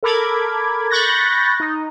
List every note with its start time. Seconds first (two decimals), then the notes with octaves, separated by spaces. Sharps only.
0.03 A4 A#4 B5 D6 G#6
0.91 B5 C#6 F#6 G6 A6 A#6
1.60 D#4